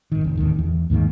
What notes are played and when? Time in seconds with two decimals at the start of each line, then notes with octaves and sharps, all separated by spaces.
0.12 G#1 D#3
0.24 F1
0.37 D1 A1 D#2 D#3
0.59 E2
0.90 D#2 G#2 D#3 A#3